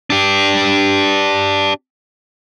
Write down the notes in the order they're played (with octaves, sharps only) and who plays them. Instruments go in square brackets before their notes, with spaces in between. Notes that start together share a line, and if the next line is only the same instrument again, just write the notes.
[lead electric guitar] D4 G4